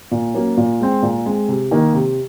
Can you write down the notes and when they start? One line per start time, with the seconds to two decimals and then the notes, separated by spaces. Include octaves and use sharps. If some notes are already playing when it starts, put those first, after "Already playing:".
0.11 A#2
0.35 F#3 A#3 C#4
0.57 A#2
0.81 G#3 C4
1.03 A#2
1.26 G#3 C4
1.49 C3
1.71 D#3 A#3 D#4
1.94 C3